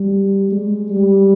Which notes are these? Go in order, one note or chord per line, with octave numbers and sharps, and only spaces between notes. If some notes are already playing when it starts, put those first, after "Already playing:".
Already playing: G3
G#3
G3